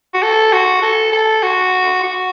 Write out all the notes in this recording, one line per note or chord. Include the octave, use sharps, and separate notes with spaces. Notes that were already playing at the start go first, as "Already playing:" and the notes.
F#4
A4
F#4
A4
A4
F#4
F#4